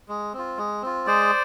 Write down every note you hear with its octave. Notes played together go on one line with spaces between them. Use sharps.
G#3
C4 F4
G#3
C4 F4
G#3 C5 D5